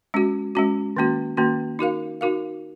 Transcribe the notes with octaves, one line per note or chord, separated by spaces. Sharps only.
G#3 C#4 F#4
G#3 C#4 F#4
D#3 A#3 C#4 F#4
D#3 A#3 C#4 F#4
D#4 F#4 A#4 F5
D#4 F#4 A#4 F5